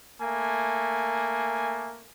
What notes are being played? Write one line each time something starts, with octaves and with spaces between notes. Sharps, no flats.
A3 A#3 G#5